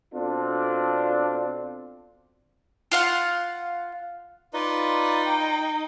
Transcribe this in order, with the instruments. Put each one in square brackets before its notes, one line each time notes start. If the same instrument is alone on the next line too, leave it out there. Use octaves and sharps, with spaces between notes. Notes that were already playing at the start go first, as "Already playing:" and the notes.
[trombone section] B2 C4 D4 F4 A4
[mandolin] F4 F5 F#5
[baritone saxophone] D#4 [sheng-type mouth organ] F4 B4 D5
[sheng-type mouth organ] G5